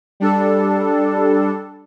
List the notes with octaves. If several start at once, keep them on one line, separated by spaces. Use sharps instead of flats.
G3 D4 A4